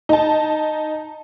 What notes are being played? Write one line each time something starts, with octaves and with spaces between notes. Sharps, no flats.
D#4 A5